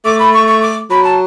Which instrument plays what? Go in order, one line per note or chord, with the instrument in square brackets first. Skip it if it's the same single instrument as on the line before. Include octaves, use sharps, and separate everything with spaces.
[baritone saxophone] A3 [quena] D6
[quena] B5
C#6
C#6
D6
[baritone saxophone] F#3 [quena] B5
[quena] A5